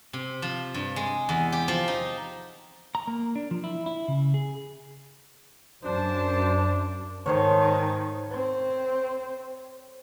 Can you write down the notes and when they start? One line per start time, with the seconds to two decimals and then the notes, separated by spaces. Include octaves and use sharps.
0.13 C3
0.42 F3
0.74 G2
0.96 G#3
1.29 E2
1.52 G4
1.68 F3
1.88 D#4
2.95 A#5
3.07 A#3
3.36 D4
3.51 F3
3.64 E4
3.86 E4
4.08 C#3
4.34 G#4
5.84 F#2 D4 C5 A5
7.26 G#2 D#3 A4 C5 C#5
8.30 C4